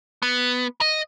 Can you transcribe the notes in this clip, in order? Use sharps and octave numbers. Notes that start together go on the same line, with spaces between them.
B3
D#5